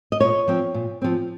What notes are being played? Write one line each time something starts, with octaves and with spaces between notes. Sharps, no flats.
D#5
A#2 C#5
F3 C4
A#2
F3 C4